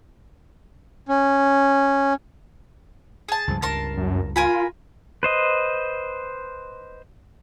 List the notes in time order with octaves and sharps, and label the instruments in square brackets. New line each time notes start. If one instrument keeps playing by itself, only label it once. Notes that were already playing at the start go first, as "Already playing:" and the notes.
[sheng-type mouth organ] C#4
[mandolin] G#4 A5
[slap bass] C#2 G2 F3
[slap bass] C#2 G2 [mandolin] A#4 A5 C6
[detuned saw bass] F#2
[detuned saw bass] F4 [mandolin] A#4 G#5 B5
[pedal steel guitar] B4 C5 D#5